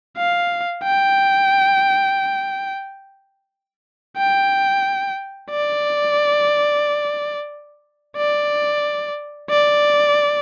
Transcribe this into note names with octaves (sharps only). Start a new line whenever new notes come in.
F5
G5
G5
D5
D5
D5